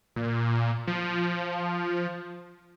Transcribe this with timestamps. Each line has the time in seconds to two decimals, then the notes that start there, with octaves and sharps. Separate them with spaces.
0.16 A#2
0.87 F3